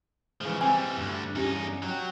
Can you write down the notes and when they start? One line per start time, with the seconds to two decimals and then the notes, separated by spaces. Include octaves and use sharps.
0.41 C#3 E3 F3 G#3
0.61 E3 G3 C4 G#5
0.97 D2 G2 D3
1.35 E2 C#4 D#4 G4
1.82 F#3 G5